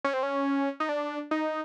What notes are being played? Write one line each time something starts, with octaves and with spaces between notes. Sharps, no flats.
C#4
C4
C#4
D#4
D4
D#4